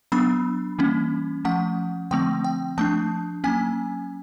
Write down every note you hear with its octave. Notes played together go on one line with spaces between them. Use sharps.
F#3 B3 D4 B5
E3 G3 A#3 C#4
F3 A3 C#4 F#5
D3 F3 A3 C4 G5
G5
F3 A3 D4 A5
F#3 A#3 C#4 G#5